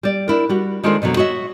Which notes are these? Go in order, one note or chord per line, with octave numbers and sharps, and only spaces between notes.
G3 D5
D4 E4 A#4
G3 F#4
D#3 G#3 D4 F4 A4 C5
F2 B2 D3 F#3
F#4 C#5 D#5 E5